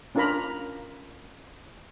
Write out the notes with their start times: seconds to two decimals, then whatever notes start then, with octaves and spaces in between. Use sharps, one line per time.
0.15 C#4 D4 F4 A#4 A#5 B5